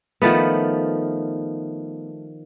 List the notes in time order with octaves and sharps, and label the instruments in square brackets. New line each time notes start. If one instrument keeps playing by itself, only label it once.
[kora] D#3 F3 A3 B3